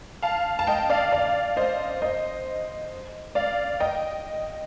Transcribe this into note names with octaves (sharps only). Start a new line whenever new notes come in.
F5 A5
A5
D#5 G5
D5 F5
D5 F5
C5 D#5
C5 D#5
D5 F5
D#5 G5